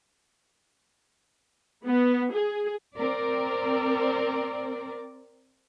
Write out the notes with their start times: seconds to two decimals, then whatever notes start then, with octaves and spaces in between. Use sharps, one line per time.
1.86 B3
2.33 G#4
2.95 C4 A#4 D5